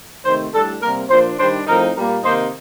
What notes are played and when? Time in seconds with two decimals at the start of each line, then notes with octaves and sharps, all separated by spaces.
0.25 C3 D#3 A3 C5
0.54 A2 G3 D4 A4
0.82 C3 G3 A#3 A#4
1.10 A#2 F3 A#3 D4 C5
1.38 D#3 G3 D4 C5
1.67 A2 F3 C4 D#4 A#4
1.96 A#2 G3 A#3 A#4
2.23 C3 D#3 A#3 D#4 C5